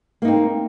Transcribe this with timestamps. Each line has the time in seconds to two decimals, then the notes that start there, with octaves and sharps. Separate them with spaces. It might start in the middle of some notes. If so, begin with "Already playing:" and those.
0.22 A#3
0.25 D#4
0.28 C4